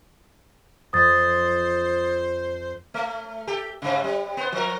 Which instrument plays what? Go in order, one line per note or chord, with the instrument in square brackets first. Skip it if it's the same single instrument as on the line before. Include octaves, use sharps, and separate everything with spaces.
[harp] F2 [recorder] C5 [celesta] D#6 A6
[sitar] A3
G4 A4
G2 C#3
G3
B3 C5
F3 A#4